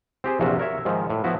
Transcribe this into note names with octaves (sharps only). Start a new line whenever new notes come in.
C4 G4 G#4 C5
A#1 E2 C3 F4 F#4 E5
A#4 C#5 E5
G#2 D#3 F3
A2
F3 B3 E4 F#4